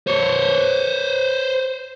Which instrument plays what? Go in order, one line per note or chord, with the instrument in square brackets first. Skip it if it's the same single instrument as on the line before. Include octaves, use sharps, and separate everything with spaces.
[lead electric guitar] C5 C#5